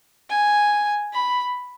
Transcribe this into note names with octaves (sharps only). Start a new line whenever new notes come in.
G#5
B5